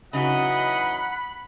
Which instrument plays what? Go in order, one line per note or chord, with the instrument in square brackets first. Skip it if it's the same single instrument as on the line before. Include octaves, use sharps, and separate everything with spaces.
[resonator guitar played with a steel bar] C#3 D#4 F#4 [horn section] E3 F#3 D#5 [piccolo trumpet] F#5 [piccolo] B5